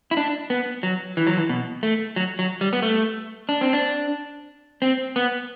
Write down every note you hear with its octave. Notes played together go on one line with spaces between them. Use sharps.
E4
D4
B3
F#3
E3
F#3
E3
B2
A3
F#3
F#3
G3
B3
A3
D4
C4
D4
C4
B3